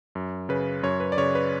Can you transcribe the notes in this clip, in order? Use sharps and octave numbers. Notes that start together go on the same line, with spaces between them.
F#2
C#3 B4
F#2 C#5
B4
D5
C#3 C#5
B4